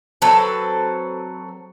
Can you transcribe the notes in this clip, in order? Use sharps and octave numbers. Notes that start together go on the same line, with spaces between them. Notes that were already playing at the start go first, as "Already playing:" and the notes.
F#3 C4 A4 B4